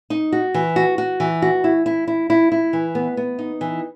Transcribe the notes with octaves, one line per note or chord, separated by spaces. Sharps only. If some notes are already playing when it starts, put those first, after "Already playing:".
D#4
F#4
E3
F#4
F#4
E3
F#4
E4
E4
E4
E4
E4
E3
B3
B3
D#4
E3